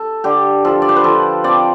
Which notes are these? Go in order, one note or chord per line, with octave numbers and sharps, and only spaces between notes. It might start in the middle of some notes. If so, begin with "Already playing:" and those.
Already playing: A4
D3 G4
F3 A4
D5
C5
B4
F3 A4
C4 D5